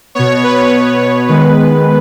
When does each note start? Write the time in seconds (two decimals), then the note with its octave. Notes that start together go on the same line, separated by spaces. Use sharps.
0.15 B2 B3 C#5
0.44 B4
0.72 B4
1.00 C#5
1.28 D#3 G#3 B3 B4